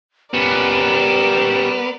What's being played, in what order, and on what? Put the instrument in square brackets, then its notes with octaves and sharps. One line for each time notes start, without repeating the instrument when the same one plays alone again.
[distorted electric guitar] G3 C#4 [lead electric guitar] B3 [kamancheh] A#4 D5 [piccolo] E7